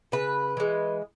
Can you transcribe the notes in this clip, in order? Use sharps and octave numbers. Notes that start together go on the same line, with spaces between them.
C#3 B4
E3 G#3